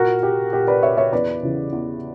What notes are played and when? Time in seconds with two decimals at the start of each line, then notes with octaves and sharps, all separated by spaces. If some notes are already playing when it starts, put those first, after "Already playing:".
Already playing: A#2 F#4 A#4
0.23 G4
0.52 A#2 G4
0.67 B4 D5
0.83 C#5 E5
0.97 C#5 E5
1.12 E2 B4 D5
1.43 C#3 E3
1.72 E2